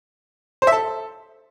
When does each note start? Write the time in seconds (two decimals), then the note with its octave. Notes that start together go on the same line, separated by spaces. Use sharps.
0.62 C5
0.67 E5
0.72 A4